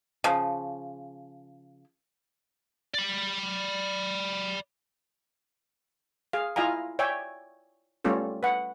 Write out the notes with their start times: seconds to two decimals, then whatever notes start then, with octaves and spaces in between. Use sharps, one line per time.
0.24 C#3 F3
2.94 D5 B5
6.33 G#4 F5
6.56 E4 F4 D#5 F5 G#5 A#5
6.99 C#5 D5 E5 G5 G#5
8.04 G3 A3 B3 C#4 F4 A4
8.43 B4 F#5